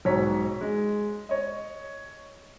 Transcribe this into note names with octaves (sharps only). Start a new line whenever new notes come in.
B1 G#2 C#5 B6
G#3
C#5 D#5